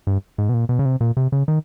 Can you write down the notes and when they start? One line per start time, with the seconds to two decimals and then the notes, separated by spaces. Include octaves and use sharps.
0.07 G2
0.38 G#2
0.49 B2
0.54 A#2
0.69 B2
0.79 C#3
0.85 C3
1.01 A#2
1.17 C3
1.32 C#3
1.48 D#3